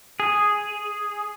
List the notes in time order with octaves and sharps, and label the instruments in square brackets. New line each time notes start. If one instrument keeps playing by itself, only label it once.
[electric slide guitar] G#4